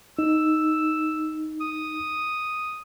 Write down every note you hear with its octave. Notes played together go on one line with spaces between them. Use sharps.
D#4 E6
D#6